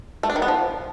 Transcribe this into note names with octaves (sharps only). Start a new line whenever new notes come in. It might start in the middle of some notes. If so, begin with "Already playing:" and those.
A3
D4
D#3
B3
F3